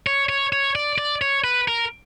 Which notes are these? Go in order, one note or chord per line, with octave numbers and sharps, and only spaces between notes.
C#5
C#5
C#5
D5
D5
C#5
B4
A#4